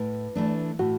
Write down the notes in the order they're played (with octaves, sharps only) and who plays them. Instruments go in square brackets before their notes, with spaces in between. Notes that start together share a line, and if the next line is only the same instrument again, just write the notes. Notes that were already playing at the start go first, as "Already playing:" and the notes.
Already playing: [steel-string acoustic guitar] A2 [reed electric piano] B4
[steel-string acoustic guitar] E3 A3 D4
[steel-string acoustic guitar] A2 [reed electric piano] F#4